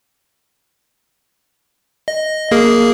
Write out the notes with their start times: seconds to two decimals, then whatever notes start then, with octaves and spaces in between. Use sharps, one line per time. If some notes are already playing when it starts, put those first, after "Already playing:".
2.08 D#5
2.51 A#3 G#4 A#4